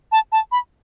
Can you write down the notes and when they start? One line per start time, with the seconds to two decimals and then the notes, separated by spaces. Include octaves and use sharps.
0.12 A5
0.32 A5
0.52 B5